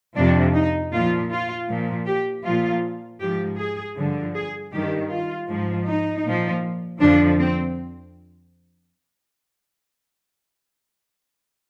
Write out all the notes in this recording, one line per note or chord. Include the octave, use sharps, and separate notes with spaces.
F2 C3 F3 D4
D#4
A#2 F3 F4
F4
A#2 F3
G4
A#2 F3 F4
G#2 F3 G4
G#4
G2 D3 F3
G#4
G2 D#3 G4
F4
G#2 F3
D#4
A#2 F3
F2 D3 F3 D4
C4